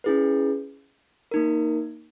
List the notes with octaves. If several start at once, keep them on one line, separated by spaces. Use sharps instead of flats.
C#4 E4 G#4 B4
A#3 D#4 A#4